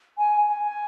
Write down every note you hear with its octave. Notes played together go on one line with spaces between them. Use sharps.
G#5
G#5